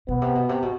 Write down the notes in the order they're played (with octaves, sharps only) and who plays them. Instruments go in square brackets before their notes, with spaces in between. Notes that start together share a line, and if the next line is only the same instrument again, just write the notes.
[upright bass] B2 [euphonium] B3
[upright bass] C3
B2
C3
B2